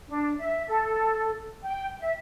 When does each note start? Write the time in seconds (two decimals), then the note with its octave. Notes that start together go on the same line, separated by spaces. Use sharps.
0.08 D4
0.39 E5
0.68 A4
1.63 G5
2.00 E5